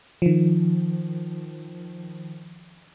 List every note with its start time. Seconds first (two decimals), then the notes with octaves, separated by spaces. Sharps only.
0.22 D#3 F3